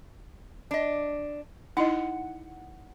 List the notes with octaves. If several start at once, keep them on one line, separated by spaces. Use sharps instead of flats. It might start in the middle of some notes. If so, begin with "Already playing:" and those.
D4 D#5
D#4 E4 D#5 F#5